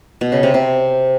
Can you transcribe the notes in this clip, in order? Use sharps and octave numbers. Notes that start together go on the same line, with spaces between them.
B2
C#3
C3
C3